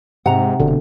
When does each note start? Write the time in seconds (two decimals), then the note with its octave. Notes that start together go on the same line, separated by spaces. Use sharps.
0.26 G#2 C3 F#5 A#5
0.60 F1 B2 D3